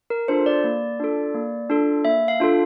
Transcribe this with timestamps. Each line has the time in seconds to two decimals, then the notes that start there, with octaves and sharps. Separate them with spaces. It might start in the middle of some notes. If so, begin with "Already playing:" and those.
0.10 A#4
0.28 D4 F4 A4 C5
0.46 D5
0.64 A#3
1.00 D4 F4 A4
1.34 A#3
1.70 D4 F4 A4
2.05 A#3 E5
2.28 F5
2.40 D4 F4 A4